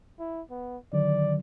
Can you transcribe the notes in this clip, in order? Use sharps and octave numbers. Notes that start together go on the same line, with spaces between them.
E4
B3
D3 D#3 F#3 D5